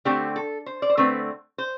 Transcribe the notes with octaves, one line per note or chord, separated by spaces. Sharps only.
D3 A3 C4 G4
A4
C5
D5
C5
D3 A3 C4 B4
C5